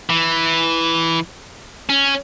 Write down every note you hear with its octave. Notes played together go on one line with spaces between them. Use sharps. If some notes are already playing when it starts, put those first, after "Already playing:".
E3
C#4